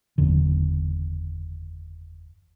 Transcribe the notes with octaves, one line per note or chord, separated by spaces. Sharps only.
F#1 E2 D3